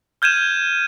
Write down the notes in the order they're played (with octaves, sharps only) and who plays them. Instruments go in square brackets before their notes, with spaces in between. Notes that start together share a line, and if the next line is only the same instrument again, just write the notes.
[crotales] F6 G6 G#6 D#7 E7